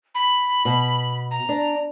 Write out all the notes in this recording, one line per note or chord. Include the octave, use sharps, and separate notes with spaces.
B5
B2
A#5
D4